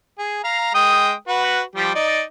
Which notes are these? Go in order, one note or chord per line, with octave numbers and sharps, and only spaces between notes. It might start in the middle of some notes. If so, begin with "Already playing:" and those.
G#4
F5 A#5
G#3 G5 D#6
F#4 B4
F3 G3 G4
D#4 D5